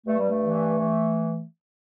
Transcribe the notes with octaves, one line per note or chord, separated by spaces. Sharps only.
G2 A3
G3
A3
E3
E3